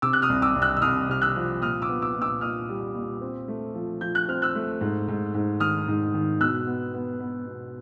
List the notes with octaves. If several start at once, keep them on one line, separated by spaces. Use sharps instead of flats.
C3 D6 E6
F#6
D#6 F6
C2
D6 E6
C2
E6 F#6
E6
C2 D#6 F6
C3 F6
E6 F#6
F3
A#2 D#6 F6
D6 E6
B3
D6 E6
A#2
D6 E6
A#2 D#6 F6
G3
A#2
C4
A3
F3
F3 G6
F#6
C4 F6
E6 F#6
A3
G#2
G#2
G#2
D#3 D#6 F6
G#2
D#3
B2 E6 F#6
B3
B3
B3
B2